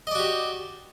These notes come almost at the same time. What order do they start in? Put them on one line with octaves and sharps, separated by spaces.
D#5 D5 F#4 G4